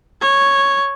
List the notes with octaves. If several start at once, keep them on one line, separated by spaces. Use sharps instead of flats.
C#5